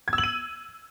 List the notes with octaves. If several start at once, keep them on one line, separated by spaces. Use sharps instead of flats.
G#6
E6
F#7
D#7